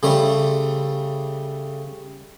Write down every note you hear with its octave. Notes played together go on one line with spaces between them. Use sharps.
C#3 G3 A3 C5